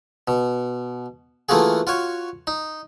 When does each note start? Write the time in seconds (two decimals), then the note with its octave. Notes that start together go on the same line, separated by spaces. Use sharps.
0.28 B2
1.49 E3 A3 A#3 F4 F#4 G#4
1.87 F4 F#4 C#5
2.47 D#4